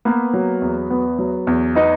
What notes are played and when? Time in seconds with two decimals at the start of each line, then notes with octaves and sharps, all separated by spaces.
0.05 A#3 B3 B4
0.33 F#3
0.62 E2
0.90 B3
1.19 F#3
1.47 E2
1.75 B3 D#4 D#5